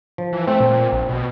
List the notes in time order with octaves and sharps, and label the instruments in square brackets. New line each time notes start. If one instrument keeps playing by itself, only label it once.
[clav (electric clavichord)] F3
[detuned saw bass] E3
[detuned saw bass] A3 [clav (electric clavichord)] C4
[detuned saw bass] A#2
A#1
B2